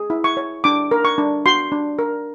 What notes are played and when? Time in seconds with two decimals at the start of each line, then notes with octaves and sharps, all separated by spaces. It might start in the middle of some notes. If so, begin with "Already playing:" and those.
Already playing: G#4
0.10 E4
0.24 C#6
0.37 C#5
0.64 D4 D6
0.91 A#4
1.05 C#6
1.18 D4
1.46 F#4 C6
1.72 D4
1.99 A#4